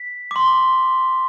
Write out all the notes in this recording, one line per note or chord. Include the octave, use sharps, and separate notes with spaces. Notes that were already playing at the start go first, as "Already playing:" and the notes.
Already playing: B6
D6
C6